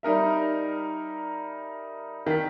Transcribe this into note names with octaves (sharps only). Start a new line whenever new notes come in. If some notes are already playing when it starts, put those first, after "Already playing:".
G3 D#4 A#4 E5
D#3 B6